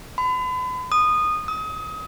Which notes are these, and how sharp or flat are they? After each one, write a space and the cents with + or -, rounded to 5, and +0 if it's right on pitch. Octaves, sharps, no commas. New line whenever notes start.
B5 +40
D#6 -15
D#6 +30